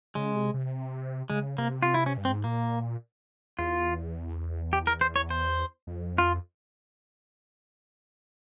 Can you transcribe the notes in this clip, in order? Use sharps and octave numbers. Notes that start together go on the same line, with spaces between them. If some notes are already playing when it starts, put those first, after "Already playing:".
C#3 G#3
C3
C3
C#3 G#3
C3 A#3
F4
E4
C#4
G2
C4
G#2
A#2 A#3
E2 F4
G4
A#4
C5
C#5
C5
F2
F4